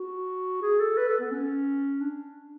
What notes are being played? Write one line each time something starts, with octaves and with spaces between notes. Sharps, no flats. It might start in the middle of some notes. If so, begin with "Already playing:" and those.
Already playing: F#4
G#4
A4
B4
A4
B3
C#4
D4